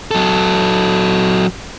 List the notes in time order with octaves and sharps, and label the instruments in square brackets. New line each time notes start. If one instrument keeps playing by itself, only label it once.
[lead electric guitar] F#3 A4